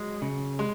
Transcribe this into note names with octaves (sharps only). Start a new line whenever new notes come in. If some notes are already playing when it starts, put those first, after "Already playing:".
Already playing: F#3 G#3
C#3
G#3